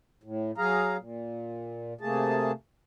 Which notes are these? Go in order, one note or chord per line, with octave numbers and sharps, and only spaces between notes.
A2
F#3 G#4 F5 A#5
A#2
C3 A3 A#3 G#4 A5